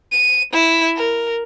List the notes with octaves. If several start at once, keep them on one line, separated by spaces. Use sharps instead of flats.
D#7
E4
A#4